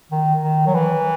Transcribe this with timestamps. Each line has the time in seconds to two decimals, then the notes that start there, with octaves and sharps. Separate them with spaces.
0.12 D#3
0.43 D#3
0.67 F#3
0.75 E3